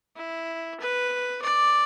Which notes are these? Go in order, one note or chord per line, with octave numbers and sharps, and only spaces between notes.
E4
B4
D5